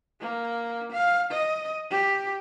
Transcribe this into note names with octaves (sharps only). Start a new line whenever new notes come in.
A#3
F5
D#5
G4